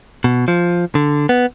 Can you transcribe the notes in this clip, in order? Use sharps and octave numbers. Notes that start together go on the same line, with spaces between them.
B2
F3
D3
B3